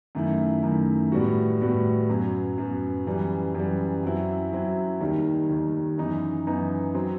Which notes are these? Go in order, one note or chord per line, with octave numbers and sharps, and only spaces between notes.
F#2 D#3 A3 E4
F#2 D#3 A3 E4
A2 G3 B3 F#4
A2 G3 B3 F#4
F#2 F#3 B3
F#2 F#3 B3
F#2 E3 G3
F#2 E3 G3
F#2 F#3 C4 E4
F#2 F#3 C4 E4
D#2 D#3 G3
D#2 D#3 G3
F#2 E3 B3 D#4
F#2 E3 B3 D#4
F#3 C4